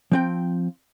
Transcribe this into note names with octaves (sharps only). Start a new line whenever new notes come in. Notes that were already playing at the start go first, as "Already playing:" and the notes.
F3 C4 G5